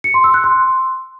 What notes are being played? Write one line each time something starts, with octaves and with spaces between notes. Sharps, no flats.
C#7
C6
E6
F#6
C6